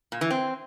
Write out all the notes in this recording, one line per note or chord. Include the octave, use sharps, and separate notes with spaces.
A#2
E3
C4